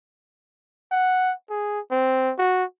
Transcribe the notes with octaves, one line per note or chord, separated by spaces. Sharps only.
F#5
G#4
C4
F#4